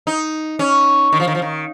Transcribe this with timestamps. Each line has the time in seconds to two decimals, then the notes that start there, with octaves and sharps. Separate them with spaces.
0.07 D#4
0.59 C#4
1.13 D#3
1.20 F3
1.27 D#3
1.35 F3
1.42 D#3